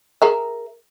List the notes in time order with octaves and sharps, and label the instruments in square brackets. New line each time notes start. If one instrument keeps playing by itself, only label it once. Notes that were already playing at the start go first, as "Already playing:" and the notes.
[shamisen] G#4 A#4 E5